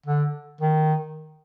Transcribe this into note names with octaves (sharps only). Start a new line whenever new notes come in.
D3
D#3